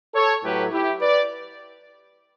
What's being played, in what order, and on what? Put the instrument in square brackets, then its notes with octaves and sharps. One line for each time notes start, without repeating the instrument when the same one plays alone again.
[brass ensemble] A4 C#5
A2 F#3 G4 B4
E4 G4
B4 D5